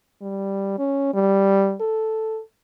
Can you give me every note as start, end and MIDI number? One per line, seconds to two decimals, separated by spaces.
0.21 0.75 55
0.79 1.13 61
1.14 1.76 55
1.81 2.40 69